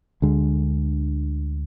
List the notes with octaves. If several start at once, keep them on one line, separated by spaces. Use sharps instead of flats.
D2 D3 G#3